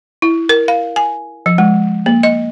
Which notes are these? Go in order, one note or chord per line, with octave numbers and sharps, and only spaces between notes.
E4
A#4
F5
G#5
F3
G#3
A#3
D#5